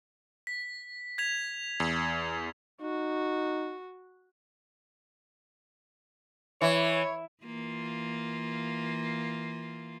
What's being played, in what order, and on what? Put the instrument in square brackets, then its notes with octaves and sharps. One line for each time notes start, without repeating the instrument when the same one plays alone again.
[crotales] B6
G#6 B6 F7
[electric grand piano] E2
[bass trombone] D#4 [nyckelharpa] F#4
[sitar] E3 [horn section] C#5
[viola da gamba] E3 A#3 F4